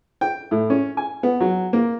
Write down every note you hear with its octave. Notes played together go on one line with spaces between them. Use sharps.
G5
A2
C#4
G#5
B3
F#3
A#3